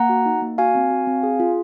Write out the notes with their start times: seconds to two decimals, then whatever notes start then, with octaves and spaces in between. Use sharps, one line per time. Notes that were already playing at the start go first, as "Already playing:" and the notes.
Already playing: A#3 F#5 A#5
0.09 F#4
0.26 D#4
0.42 A#3
0.58 F#4 F5 G#5
0.75 C4
0.91 F#4
1.07 C4
1.23 G#4
1.40 F4